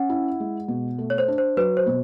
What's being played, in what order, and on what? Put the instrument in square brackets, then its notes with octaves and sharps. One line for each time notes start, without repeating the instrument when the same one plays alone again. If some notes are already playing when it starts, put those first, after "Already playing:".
Already playing: [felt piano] C#4 [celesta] F#5
[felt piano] E4
G#3
B2
A3
[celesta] C#5
C5
[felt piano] D4
[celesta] C5
[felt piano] F#3 [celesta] B4
[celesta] C5
[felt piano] B2